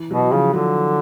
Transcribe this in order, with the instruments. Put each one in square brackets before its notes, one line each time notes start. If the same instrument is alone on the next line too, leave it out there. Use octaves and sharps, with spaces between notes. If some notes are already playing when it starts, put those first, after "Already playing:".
Already playing: [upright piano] E3
[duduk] B2 [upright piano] F#3
[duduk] C#3 [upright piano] F3
[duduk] D3 [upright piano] F#3